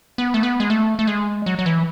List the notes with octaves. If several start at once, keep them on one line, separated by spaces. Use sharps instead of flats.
B3
A3
B3
G#3
A3
A3
G#3
F#3
F#3
E3